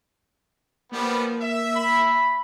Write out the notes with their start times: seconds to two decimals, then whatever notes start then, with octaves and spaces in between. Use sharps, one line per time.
0.93 F3 G3 A#3 B3
1.41 E5
1.76 B5